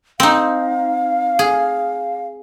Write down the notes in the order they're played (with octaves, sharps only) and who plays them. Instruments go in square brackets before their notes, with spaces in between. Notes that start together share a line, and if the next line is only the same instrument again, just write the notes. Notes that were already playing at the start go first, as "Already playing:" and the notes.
[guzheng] C4 D#4 [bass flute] F5
[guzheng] G#4